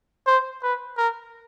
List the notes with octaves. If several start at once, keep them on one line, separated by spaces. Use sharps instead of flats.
C5
B4
A#4